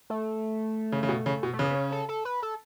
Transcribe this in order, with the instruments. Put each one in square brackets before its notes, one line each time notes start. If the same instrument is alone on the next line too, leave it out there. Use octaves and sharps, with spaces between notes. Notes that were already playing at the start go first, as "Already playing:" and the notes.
[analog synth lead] A3
[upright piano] C#3
C#3
B2
C#3
B2
[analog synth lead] A3
[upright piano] C#3 [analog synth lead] B3
[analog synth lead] B3
C#4
A4
A4
B4
A4